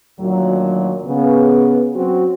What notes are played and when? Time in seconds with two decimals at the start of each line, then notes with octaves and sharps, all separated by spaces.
0.19 D2 A#2 D#3 F#3
1.07 C#3 B3
1.95 F#3 C4 C#4 F#4